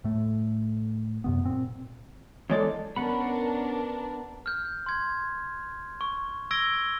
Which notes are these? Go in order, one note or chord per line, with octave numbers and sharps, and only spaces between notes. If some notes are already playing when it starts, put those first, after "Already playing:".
A2 A3
F#2 C3 B3
A#2 C4
E2 G#3 A4 C#5 D5
B3 C#4 D4 A#4 F#5 B5
F6 G6
C6 G#6
C#6
E6 G#6 A#6 D7 G7